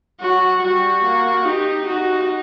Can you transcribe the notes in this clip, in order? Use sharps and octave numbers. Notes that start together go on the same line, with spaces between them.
F#3 F#4
G3 F#4
A#3
D#4 G4
D#4 F#4